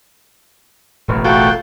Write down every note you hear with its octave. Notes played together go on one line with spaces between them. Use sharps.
E1 A1
A3 F4 F#4 G5